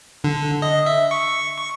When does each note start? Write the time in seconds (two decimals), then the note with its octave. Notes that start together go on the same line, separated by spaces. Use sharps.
0.24 D3
0.62 D#5
0.86 E5
1.11 C#6
1.58 C#6